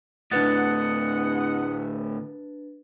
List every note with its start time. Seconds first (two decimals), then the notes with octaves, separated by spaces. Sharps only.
0.32 D2 A2 D4 B4 D#5 F#5 A6